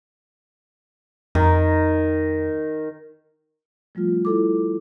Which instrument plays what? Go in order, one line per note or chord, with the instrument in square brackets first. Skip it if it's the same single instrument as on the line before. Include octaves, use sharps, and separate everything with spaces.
[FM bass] F2 [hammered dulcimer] D#3
[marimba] F3 G3 A3 F4
E4 A4 D6